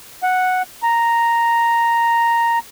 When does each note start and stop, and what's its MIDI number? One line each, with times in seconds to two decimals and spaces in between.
0.23 0.62 78
0.83 2.59 82